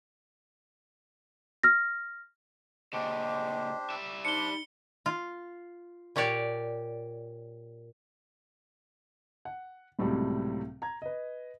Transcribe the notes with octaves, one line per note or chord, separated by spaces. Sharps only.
F6 A#6
A#2 C#3 D4 G4 C5 D#5
G3 E5
D4 D#4 C5 C#7 G7
F4
A#2 G4 C#5 D5 A5
F#5
C#2 A2 C3 F#3 G3 C4
A#5 G#6
B4 D#5